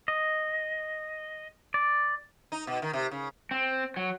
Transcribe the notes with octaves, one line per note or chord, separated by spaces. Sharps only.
D#5
D5
D#4
B2
D#3
C3
C#3
C4
F#3